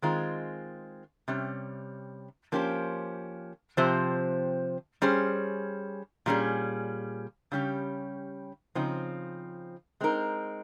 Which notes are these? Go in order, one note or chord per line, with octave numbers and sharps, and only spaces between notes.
D#3 G#3 C4 F4 G#4
C3 G3 C#4
F3 A#3 C#4 G4 C5
C3 F3 C4 G4 C5
G3 C#4 G#4 C5
A#2 G3 C#4 G#4
C#3 G3 C#4 G4
C#3 F3 C4 D#4
G#3 C4 D#4 A#4